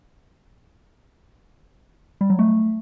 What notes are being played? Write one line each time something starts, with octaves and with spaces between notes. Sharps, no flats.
G3
F#3
A3